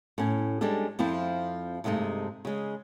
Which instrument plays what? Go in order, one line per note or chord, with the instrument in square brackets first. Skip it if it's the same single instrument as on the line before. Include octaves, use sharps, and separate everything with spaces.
[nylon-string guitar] A2 C#4
G3 G#3 C#4 D4 A4
F2 F3 C4 E4 F4
G2 C3 G#3 A3 D#4
C#3 G#3